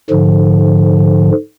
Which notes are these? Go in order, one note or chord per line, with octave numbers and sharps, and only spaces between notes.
G#2 D3 F3